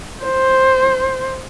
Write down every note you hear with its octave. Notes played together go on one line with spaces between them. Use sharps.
C5